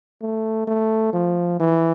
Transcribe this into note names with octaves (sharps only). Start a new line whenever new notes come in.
A3
A3
F3
E3